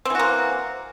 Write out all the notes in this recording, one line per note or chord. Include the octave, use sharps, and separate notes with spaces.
E3 A#3 C4 F#4